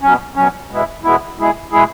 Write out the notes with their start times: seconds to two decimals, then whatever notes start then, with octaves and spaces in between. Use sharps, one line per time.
0.02 B2 F#3 C#4
0.36 B2 F#3 C#4
0.70 E2 B2 G#3 B3 E4
1.04 E2 B2 G#3 B3 E4
1.38 B2 G#3 E4 G#4
1.72 B2 G#3 E4 G#4